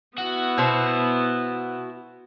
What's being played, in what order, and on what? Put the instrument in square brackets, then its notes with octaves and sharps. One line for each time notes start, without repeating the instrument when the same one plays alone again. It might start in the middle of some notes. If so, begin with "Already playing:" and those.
[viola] B3 E4 [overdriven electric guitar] F#4
[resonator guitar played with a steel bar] B2 C5